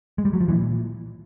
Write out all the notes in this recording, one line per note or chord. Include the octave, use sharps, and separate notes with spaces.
G#3
G3
F#3
F3
A#2 E3